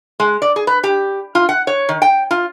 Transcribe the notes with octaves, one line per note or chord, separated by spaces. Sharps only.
G#3
D5
G#4
B4
G4
F4
F#5
C#5
D#3
G5
F4